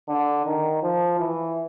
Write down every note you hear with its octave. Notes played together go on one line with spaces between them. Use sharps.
D3
D#3
F3
E3